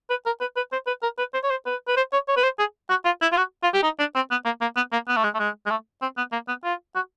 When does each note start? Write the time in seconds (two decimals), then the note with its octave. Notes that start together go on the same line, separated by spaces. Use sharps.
0.10 B4
0.26 A#4
0.40 B4
0.56 B4
0.72 C5
0.87 B4
1.02 A#4
1.18 B4
1.34 C5
1.43 C#5
1.50 C5
1.66 B4
1.88 B4
1.96 C5
2.13 C#5
2.28 C#5
2.37 B4
2.43 C5
2.59 G#4
2.89 F#4
3.05 F4
3.22 E4
3.32 F4
3.37 F#4
3.63 F4
3.73 G4
3.83 D#4
3.99 D4
4.15 C4
4.31 B3
4.45 A#3
4.61 A#3
4.76 B3
4.92 A#3
5.08 B3
5.16 A3
5.24 G#3
5.34 A3
5.39 G#3
5.66 G#3
5.70 A3
6.02 C4
6.17 B3
6.32 A#3
6.48 B3
6.64 F4
6.95 F#4